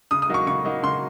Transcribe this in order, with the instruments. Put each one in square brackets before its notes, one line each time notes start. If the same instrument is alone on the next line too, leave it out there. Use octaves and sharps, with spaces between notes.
[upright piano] C#3 D#6
D#6
F#3 A#3 D#4 C#6
C#3 C#6
F#3 A#3 D#4
C#3 C6